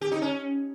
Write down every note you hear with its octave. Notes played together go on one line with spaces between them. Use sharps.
G4
D#4
C#4